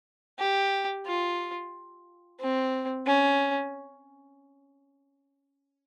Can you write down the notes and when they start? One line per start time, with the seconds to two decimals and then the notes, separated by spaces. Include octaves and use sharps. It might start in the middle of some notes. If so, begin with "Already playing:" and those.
0.39 G4
1.06 F4
2.40 C4
3.07 C#4